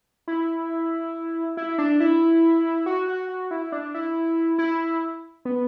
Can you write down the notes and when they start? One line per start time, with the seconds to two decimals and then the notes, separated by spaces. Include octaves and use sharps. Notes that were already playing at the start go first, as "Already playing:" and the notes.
0.28 E4
1.57 E4
1.78 D4
2.00 E4
2.86 F#4
3.08 F#4
3.29 F#4
3.51 E4
3.72 D4
3.94 E4
4.58 E4
5.45 B3